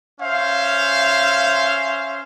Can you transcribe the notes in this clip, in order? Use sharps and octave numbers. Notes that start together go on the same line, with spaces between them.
C#4 C5 E5 F5